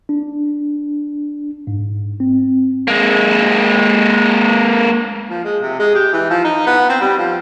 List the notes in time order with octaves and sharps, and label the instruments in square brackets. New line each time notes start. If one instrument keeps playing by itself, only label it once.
[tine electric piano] D4
G#2
C4
[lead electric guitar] G#3 A#3
[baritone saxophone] F3
G#3
C3
G#3
G4
E3
F3
D#4
B3
C4
G3
F3